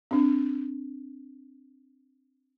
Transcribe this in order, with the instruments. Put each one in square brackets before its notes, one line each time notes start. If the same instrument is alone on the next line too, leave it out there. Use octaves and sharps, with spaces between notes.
[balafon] C4 D4